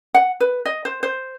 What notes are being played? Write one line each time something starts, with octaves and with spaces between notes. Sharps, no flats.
F#5
B4
D#5
C5
C5